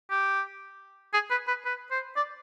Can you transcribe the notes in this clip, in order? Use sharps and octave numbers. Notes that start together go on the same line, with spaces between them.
G4
G#4
B4
B4
B4
C5
D5